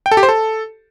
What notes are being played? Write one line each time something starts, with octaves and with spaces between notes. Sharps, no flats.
G5
A4
G4
C5
A4